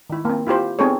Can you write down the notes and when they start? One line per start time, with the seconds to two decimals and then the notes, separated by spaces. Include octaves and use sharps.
0.10 D#3 E4
0.25 A#3 C4
0.46 E4 F4 G4 C5
0.79 B3 C4 D#4 G#4 A4 C#5